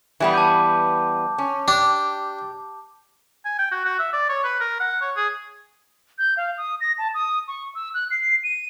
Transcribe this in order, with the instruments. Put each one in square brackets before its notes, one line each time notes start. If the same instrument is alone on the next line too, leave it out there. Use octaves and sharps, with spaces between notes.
[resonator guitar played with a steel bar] E3 G3 B3
[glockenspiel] A5 D6 G6
[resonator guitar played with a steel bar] C#4
[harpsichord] D4 [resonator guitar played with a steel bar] G4
[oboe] G#5
G5
F#4
F#4
E5
D5
C#5
B4
A#4
F#5
C#5
G#4
[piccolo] G6
F5
D#6
A#6
A5
D#6
C#6
E6
F#6
C7
D#7